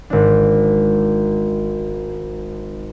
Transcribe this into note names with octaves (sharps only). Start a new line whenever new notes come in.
G#1 D4